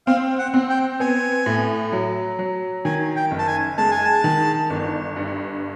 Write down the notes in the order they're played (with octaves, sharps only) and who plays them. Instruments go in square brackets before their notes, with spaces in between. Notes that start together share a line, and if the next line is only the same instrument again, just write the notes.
[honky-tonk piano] C4 [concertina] F5
[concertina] F#5
[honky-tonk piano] C4
[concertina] G5
[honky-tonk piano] B3 [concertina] G#5
[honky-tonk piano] A2
F#3
F#3
[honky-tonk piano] D#3 [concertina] G#5
[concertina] G5
[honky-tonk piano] F#1
[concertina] A5
G#5
[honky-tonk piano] G#3 [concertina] A5
[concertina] G#5
A5
[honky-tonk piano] D#3
G1
G2